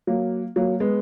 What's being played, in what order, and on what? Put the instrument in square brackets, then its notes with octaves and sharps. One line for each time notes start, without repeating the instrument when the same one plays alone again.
[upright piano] F#3 A#3
F#3 A#3
G#3 B3